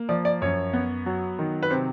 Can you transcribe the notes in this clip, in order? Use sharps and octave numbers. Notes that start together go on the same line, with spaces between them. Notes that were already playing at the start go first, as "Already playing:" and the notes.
Already playing: A#3
F3 D5
D5
F#2 C#5
B3
F#3
D#3
B4
C3 C5